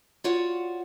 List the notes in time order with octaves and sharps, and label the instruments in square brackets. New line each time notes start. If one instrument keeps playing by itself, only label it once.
[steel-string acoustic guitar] F4 F#4 C#5 D5 F#5